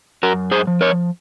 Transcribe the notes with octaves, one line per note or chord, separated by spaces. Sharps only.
F#2 F#4 A#4
G#4 C5
F3
A#4 C#5